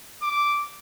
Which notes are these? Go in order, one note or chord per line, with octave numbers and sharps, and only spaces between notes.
D6